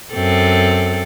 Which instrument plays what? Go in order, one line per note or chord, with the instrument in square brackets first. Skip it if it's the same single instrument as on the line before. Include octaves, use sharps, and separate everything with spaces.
[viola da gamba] F#2 C4 A4